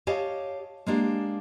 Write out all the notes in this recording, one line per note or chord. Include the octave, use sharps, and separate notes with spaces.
G4 C#5 D#5 F5 A5
G#3 A#3 D4 G4